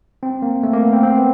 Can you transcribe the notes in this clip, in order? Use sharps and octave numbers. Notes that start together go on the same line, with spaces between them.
C4
A#3
A3
A#3
B3
C4
C4
B3